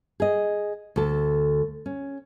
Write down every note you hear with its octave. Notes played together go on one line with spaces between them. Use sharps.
G#4 D#5
D2 A4
C#4